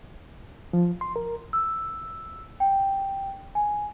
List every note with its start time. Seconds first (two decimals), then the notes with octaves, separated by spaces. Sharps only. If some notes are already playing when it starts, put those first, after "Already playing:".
0.73 F3
1.01 C6
1.16 A#4
1.53 E6
2.60 G5
3.55 G#5